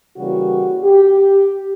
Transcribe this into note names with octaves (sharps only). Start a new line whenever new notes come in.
C#3 E3 G3 A#3 F#4
G4